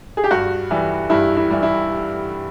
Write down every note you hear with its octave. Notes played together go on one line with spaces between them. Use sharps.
G#4
G4
G2 F#4
E3 G3
G2 E4
E4
E3 G3
E4